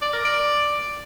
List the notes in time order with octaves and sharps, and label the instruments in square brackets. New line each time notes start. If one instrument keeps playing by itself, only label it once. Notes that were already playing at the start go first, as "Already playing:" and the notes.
[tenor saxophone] D5
A#4
D5